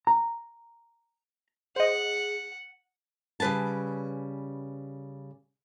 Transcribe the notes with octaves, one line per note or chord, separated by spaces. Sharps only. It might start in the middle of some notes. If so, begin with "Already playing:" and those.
A#5
G#4 C5 D#5 F#5
C#3 G3 B4 G#5 A5